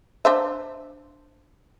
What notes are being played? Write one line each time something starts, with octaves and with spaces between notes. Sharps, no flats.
D4 C5 E5